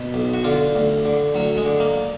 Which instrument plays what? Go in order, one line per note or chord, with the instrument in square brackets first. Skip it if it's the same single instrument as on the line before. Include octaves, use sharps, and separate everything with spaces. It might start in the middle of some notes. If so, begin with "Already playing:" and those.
Already playing: [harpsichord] B2
B1
F#4
D3 F4
D2
D3
D2 F#3
G#3
D3
A#3